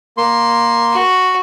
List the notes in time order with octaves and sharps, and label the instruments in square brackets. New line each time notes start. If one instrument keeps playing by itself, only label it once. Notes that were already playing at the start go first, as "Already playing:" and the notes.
[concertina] A#3 C6
[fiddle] F#4